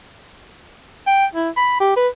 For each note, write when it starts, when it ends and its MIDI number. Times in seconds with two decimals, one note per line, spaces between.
1.07 1.26 79
1.35 1.49 64
1.57 1.76 83
1.80 1.96 67
1.96 2.08 71